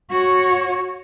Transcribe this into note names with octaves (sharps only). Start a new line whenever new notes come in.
F#4 C#5